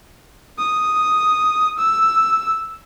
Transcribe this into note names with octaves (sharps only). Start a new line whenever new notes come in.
D#6
E6